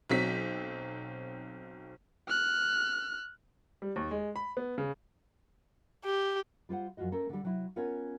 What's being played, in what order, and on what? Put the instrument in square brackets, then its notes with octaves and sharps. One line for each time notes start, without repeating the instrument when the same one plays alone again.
[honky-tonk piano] B1 F#3 C4 B6
[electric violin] F6 F#6
[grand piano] G3
D#2
G#3
B5
B3
C#3
[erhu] G4
[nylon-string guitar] G3 F4 C5 F#5
F#2 F3 F4 F#4 D#5
A3 C#4 A4 A#4
D3 G3
C3 F#3 E4
B3 C#4 F4 A#4 C#5